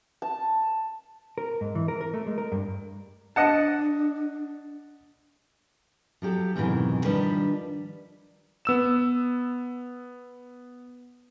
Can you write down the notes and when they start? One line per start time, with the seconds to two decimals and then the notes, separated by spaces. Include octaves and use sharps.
0.22 A5
1.38 A#4
1.61 G#2
1.75 E3
1.88 A#4
2.01 A#4
2.14 A3
2.27 G#3
2.38 A#4
2.52 G2
3.36 D4 D#5 F#5 A5
6.22 F3 F#3 G4 A4
6.56 F2 G#2 B2 D#3 E3 F#3
7.05 D#3 F3 G3 D4 G4 B4
8.65 B3 E6 E7